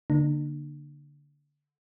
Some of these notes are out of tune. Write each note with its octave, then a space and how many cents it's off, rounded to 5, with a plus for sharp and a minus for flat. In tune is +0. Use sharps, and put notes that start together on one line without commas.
D3 -20 A#3 +0 D4 +40